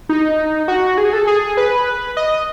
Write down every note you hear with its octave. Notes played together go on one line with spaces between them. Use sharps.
D#4
F#4
G#4
A4
G#4
B4
D#5